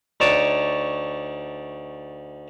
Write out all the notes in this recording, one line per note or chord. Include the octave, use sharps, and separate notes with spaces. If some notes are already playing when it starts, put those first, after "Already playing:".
D2 D#4 C#5 D5 A5 C#6